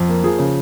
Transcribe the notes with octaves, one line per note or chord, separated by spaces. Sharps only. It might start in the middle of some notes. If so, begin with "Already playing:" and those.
Already playing: F2
A#3
F3 G#4
C#3